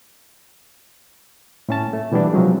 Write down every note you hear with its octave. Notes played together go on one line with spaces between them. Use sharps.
A2 C#4 A5
A3
B2 E3 G3 B3 D4
C3 F3 F#3 G#3